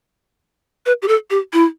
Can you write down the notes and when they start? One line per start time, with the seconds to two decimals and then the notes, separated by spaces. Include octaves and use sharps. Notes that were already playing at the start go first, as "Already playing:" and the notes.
0.86 B4
1.02 G4
1.08 A4
1.30 G4
1.53 E4